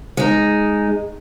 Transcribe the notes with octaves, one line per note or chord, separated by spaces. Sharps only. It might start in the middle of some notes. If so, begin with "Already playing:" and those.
G#3 D#4